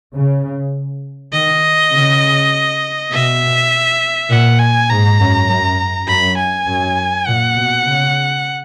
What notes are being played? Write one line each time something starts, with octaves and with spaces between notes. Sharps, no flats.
C#3
D#3 D#5
C#3
B2 E5
A#2 F#5
G#5
G#2 A#5
F#2
F#2
F#2 B5
G#5
F#2
A#2 F#5
B2
C#3